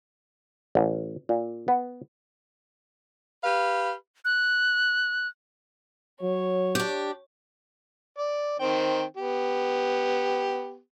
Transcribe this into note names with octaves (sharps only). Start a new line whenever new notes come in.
A1
A#2
B3
G4 B4 F5
F#6
F#3 C#5
D4 G4
D5
D#3 C4 G5
B3 G4